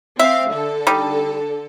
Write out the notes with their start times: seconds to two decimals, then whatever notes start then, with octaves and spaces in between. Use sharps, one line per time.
0.19 C4 E5 F5
0.50 D3 A4
0.87 G3 D#4